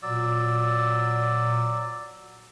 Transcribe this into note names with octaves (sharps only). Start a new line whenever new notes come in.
A#2 F#3 D5 E6